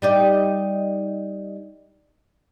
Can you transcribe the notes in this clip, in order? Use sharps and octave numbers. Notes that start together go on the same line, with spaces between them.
G3 D#4 D5